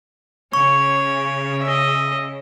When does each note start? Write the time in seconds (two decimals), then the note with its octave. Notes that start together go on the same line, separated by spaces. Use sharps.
0.53 C#3 C#5 C#6
1.63 D#5 E5